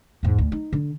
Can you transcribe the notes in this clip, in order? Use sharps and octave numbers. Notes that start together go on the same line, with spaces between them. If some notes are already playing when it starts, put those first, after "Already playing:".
E2 G#2
D2
D#4
D3